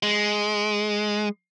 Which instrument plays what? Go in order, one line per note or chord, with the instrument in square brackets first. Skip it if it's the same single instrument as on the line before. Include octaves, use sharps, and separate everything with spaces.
[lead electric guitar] G#3